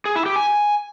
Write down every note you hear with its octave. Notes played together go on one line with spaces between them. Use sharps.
G#4
E4
G4
G#5